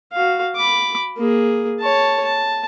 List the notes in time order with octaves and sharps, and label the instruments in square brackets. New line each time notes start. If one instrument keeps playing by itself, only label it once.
[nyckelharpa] F#4 F5
B5 D6
A#3 G#4
C#5 A5
A5